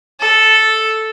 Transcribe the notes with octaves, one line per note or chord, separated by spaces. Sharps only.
A4